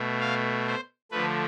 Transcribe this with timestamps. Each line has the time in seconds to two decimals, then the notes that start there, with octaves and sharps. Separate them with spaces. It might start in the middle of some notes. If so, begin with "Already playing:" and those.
Already playing: B2 A3
0.20 F5
0.67 C5
1.11 D3 F3 A3 B4